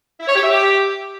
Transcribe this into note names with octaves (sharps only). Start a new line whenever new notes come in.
E4
C#5
G4
E5
G4